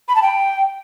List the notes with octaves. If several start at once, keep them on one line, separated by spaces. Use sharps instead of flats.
B5
A5
G5